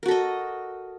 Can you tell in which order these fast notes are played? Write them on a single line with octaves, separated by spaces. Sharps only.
A#4 F#4 A4 D#5